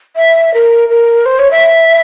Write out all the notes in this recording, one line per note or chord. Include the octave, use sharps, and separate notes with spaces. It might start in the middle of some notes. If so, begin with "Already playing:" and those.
E5
A#4
A#4
C5
C#5
E5